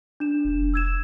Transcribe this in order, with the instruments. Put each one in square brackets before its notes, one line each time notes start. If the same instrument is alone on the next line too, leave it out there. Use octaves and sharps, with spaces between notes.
[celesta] D4 E7
[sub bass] F1
[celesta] E6 G#6 E7